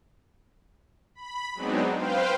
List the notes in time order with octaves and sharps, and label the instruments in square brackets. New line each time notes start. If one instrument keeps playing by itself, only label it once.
[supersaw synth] B5
F#3 G#3 B3 C4 D4 D#4
B4 C5 F5 G5